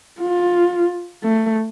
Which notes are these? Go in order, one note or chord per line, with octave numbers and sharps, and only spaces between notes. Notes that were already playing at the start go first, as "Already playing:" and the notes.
F4
A3